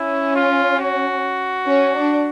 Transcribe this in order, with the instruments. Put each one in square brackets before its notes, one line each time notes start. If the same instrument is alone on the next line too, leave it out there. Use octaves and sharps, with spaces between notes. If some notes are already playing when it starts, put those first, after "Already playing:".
Already playing: [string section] C#4 [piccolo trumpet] E4
[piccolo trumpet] F4
F#4
[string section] C#4
D4